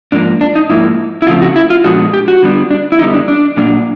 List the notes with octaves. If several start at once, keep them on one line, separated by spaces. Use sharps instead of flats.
G#2 F3 A#3 D4
D4
D#4
G#2 F3 A#3 E4
E4
C#3 F3 A3 C4 F4
F#4
E4
F4
A#2 F3 G#3 B3 D4 F#4
G4
F#4
D3 G3 B3 D4
D4
E4
F#2 D3 G3 B3 D#4
D4
D4
A#2 F#3 A#3 D4